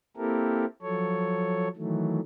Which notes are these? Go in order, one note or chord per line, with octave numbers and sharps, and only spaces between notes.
A#3 C4 E4 G4 A4 A#4
F3 F#3 A4 C#5
D#3 E3 F#3 A3